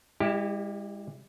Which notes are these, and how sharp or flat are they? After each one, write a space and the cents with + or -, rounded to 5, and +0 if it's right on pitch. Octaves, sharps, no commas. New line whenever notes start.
G#3 -45 E4 +0 G4 +0